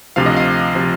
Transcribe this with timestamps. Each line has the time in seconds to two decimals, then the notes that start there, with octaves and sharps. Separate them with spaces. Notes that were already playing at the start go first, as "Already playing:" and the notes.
0.16 D2 C3 F3 F5
0.26 D#5
0.36 F5
0.75 C3 F3